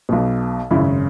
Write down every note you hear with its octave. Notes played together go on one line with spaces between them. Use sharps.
B1 B2
G#1 F#2 C#3 E4